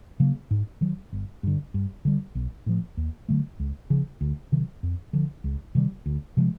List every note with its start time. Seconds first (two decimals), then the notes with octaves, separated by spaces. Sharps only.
0.20 C#3 F#3 A#3
0.51 G#2
0.81 D#3 F#3
1.13 G1
1.43 G2 D3
1.74 G2
2.05 D3 G3
2.35 B1
2.66 A2 F3
2.97 D#2
3.29 D3 F#3 A3
3.60 C#2
3.90 C#3 F3
4.21 D2
4.52 C3 D#3 F#3
4.83 F2
5.13 D3 F3
5.44 C#2
5.75 C3 D#3 G3
6.06 D2
6.37 C3 F3 G#3